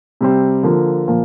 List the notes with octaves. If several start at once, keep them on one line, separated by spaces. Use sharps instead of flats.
C3 G3 C4
D3 F3 A#3 F4 A#4
A#2 F3 A#3